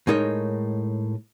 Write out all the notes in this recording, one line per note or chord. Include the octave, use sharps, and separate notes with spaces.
A2 G#3 D#4 A#4 C#5